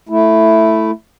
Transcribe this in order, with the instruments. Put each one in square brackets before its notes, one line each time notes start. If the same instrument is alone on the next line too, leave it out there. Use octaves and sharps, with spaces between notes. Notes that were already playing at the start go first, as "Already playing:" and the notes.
[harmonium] A3 E4